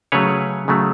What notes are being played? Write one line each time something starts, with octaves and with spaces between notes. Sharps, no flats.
C#3 F#3 A3 B4 C#5
C#3 F#3 A3